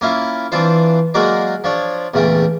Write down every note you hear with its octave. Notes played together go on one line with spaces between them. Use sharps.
A#3 C#4 E4 F4
E3 C4 D4 F4 C5
F#3 G#3 A#3 F#4 A#4 D5
F3 D4 C#5
E2 A#2 C#3 A3 G5